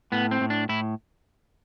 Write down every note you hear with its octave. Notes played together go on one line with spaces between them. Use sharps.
A2 B3
C4
A2
D4
A2 E4